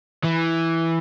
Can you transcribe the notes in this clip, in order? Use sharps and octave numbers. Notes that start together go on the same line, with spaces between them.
E3